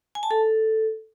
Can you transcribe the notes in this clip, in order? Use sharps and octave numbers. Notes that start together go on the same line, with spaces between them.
G#5
A5
A4